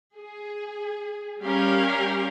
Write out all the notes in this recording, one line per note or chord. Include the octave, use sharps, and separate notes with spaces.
G#4
G3 C#4 G4 A#4 F5